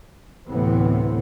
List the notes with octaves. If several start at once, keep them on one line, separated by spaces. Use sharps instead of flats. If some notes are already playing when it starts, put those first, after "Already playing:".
D2 A2 C3 E3 B3 C4